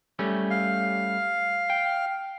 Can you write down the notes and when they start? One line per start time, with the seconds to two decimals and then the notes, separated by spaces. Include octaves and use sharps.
0.19 G3 A3 C#4
0.50 F5
1.70 G5